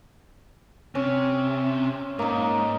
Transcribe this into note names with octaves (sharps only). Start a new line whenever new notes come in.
C3 C#4
G#2 A#3 D#4